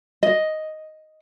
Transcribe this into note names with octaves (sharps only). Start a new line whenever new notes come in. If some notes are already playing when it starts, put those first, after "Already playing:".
D#5